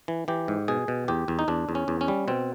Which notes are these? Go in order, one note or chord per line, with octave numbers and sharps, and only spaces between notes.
E3
E3 G4
G#2
B2 G#4
B2
E2 G4
E2
D#4
E2 D4
E2
C#4
E2
C#4
G3
B2 C4